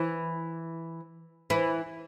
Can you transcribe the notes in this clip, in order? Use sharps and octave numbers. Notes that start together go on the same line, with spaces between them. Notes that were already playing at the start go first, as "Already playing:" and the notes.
Already playing: E3 E4
E3 E4